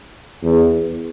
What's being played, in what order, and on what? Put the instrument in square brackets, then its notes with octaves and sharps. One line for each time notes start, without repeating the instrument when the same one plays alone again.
[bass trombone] E2